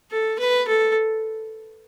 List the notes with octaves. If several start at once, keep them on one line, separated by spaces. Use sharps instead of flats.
A4
B4
A4